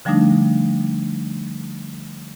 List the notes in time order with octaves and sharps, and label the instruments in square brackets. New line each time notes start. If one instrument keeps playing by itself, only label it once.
[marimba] D3 F3 G3 A3 D4 D#4